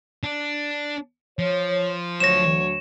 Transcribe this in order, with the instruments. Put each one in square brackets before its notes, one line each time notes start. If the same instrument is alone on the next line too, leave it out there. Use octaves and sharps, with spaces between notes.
[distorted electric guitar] D4
[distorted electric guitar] F3 [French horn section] C#5
[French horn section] D2 F#3 [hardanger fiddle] C#5 [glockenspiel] A#6 E7